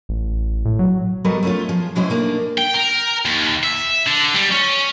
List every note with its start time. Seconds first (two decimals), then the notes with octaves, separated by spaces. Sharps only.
0.09 A1
0.65 A2
0.79 F#3
1.24 G3 B3 F#4 A4 A#4 D#5
1.43 A3 C#4 F4
1.69 F3 G#4
1.96 B2 G#3 C4 C#4 E4 C5
2.10 A3 A#3 D4 D#4
2.58 G5
2.74 A#4
3.26 D#2
3.63 E5
4.07 D3
4.34 G3
4.51 C#4